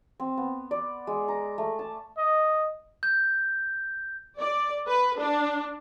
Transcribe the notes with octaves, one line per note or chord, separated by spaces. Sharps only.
C4
B3
D5
G#3
A#5
A3
A5
D#5
G6
D5
B4
D4